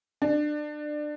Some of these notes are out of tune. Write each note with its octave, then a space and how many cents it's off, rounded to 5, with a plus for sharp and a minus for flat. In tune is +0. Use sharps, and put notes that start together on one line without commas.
D4 +25